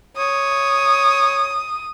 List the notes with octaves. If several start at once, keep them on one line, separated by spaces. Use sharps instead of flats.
C#5 D#6